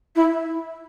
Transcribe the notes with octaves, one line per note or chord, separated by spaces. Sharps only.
E4